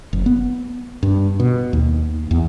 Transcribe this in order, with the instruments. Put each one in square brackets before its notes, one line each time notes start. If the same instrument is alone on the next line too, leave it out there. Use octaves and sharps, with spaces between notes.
[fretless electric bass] F#1
B3
G2
B2
D#2
E2